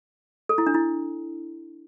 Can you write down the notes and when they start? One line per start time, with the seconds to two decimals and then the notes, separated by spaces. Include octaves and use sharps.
0.49 A4
0.58 E4
0.67 D4
0.74 E4